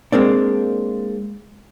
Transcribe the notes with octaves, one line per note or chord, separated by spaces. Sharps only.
G#3 A#3 C4 D4